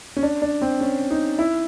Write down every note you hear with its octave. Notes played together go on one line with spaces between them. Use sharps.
C#4
D4
D4
C4
C#4
D#4
E4